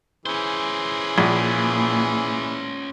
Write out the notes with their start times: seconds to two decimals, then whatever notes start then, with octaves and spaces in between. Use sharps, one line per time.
0.26 E3 C#4 G#4 C5
1.18 A#1 A#2